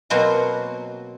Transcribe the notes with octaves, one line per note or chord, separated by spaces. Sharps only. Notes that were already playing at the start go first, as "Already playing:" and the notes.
B2 F#3 A#3 C4 F#4 B4